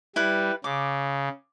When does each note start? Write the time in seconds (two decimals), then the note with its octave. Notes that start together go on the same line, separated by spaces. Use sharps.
0.16 G3 E4 B4
0.64 C#3 D6